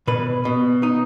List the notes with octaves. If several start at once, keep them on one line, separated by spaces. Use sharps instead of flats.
B2 B4
B2
D#4